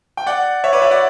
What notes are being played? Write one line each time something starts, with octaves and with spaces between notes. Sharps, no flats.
G5
D5 F#5
C#5 E5
B4 D5
C#5 E5
D5 F#5